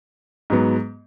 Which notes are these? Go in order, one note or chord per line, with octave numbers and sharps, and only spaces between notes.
G#2 F#3 B3